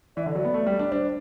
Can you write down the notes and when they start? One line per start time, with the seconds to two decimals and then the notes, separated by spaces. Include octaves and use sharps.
0.17 E3 D5
0.23 E5
0.26 D3
0.30 F#3 D5
0.45 B3
0.54 A3
0.67 G3
0.79 D4
0.92 D4 C5